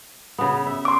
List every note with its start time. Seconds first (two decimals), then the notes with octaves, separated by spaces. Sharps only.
0.38 C#3 B3
0.67 E5
0.85 C6 D6